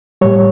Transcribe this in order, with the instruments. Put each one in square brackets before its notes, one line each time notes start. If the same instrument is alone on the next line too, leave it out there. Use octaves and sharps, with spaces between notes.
[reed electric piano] A2 G3 C#5